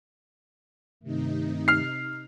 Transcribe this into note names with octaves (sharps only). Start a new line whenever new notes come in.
G2 C3 D#3 A3 D#4
F6 C7